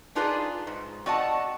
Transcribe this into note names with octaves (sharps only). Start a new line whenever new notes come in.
D4 D#4 F4 G#4 B4 D5
G#2
C4 F#4 D5 D#5 F#5 A5